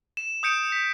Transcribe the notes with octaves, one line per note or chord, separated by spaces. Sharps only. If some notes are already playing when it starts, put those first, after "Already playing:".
E7
D#6 G6 C#7 D7 E7
B6